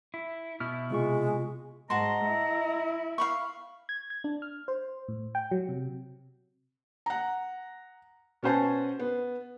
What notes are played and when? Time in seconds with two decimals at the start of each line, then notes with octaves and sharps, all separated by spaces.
0.14 E4
0.60 B2 E4 F6
0.90 C3 G#3 F4 C#6
1.90 G#2 F#4 D#5 A5 A#5 C6
2.25 E4
3.18 F5 B5 C#6
3.89 G#6
4.10 G#6
4.24 D4
4.42 F6
4.68 C5
5.08 A2
5.35 G5
5.51 F#3
5.69 C3
7.06 F#5 A#5
8.43 B2 C#4 B4 C5 G#5 A5
8.99 B3